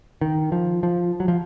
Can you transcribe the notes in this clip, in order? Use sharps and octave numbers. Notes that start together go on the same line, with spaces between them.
D#3
F3
F3
F#3
F3